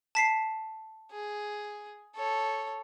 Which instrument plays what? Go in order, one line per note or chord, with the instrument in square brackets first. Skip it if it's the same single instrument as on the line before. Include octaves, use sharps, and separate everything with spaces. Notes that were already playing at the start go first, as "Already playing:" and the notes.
[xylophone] A5 B6 C7
[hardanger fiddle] G#4
A4 C#5